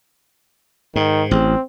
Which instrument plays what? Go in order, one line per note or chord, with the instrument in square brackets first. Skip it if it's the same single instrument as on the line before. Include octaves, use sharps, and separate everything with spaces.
[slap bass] G#2 [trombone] D#3
[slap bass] A1 [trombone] C4